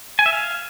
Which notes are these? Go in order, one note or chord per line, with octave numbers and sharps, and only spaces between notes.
G#5
E5
F5